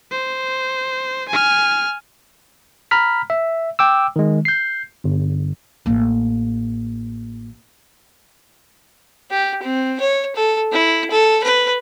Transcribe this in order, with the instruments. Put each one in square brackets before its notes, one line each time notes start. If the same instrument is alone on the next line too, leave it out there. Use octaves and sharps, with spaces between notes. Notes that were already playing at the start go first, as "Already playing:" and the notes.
[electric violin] C5
G#5 F6
[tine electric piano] A#5 B5 F6 B6
E5
G5 D6 E6
D#3 G#3
G6 C7
G1
[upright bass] A1 A#3
[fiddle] G4
C4
C#5
A4
E4
A4
B4